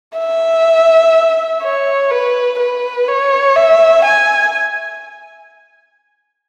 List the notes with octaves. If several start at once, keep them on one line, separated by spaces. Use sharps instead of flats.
E5
C#5
B4
B4
C#5
E5
G#5